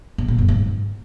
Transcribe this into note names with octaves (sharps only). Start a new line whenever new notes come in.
B2
A#2
F#2
G#2